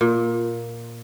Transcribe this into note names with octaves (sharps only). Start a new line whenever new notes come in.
A#2